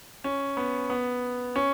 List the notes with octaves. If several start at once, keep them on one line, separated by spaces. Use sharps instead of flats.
C#4
B3
B3
C#4